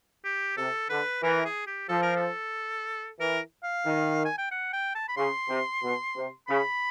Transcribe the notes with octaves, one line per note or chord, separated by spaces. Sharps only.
G4
C3 A4
D3 B4
E3 A#4
G#4
G4
F3 A4
A#4
A4
E3 A#4
F5
D#3
G#5
G5
F#5
G5
A5
B5
C#3 C6
C3
B2
C3
C#3 B5